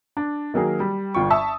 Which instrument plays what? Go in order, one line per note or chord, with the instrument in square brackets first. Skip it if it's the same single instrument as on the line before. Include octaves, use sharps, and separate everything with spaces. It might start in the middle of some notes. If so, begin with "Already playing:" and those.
[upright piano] D4
D#3 F#3 A#3 G#4 A#4
G3
G1 F4 G5 C#6
E5 A5 C#6 D#6 E6